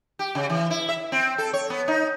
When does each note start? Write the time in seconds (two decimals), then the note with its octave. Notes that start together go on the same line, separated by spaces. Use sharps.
0.19 G4
0.35 C#3
0.50 E3
0.70 E4
0.89 E5
1.12 C4
1.38 A4
1.53 C#5
1.70 B3
1.88 D#4